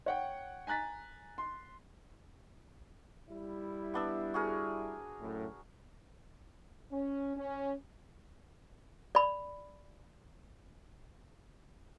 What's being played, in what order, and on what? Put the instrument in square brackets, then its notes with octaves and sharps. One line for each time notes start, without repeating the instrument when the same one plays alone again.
[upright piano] C#5 F#5 G5
G#5 A#5 F#6 A6 B6
C6
[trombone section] G3 E4
[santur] B3 D4 E6
F#4 G#4 A#4
[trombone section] F#2 A2
[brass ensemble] C#4
C#4
[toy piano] D5 B5